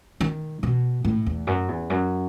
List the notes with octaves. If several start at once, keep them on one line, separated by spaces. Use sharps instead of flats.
D#3
B2
A2
E2
F#2
E2
F#2